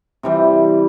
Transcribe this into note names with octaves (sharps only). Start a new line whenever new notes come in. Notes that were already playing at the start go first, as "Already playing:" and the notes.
C3 E3 G3